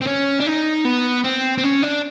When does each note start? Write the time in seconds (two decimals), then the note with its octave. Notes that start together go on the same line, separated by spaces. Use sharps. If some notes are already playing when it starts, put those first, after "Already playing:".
0.01 C4
0.06 C#4
0.40 D4
0.46 D#4
0.85 B3
1.24 C4
1.58 C4
1.64 C#4
1.83 D4